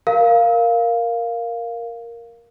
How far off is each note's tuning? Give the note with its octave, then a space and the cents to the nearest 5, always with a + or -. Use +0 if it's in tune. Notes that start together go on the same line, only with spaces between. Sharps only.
A#4 +0 F5 +0